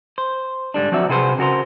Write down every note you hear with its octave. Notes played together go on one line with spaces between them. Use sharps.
C5
G#2 D3 G3 D4
F3 F#3 C4 F#4 D5 E5
C3 E4 F#4 G#4 B4 C5
C#3 F#4 A#4 C5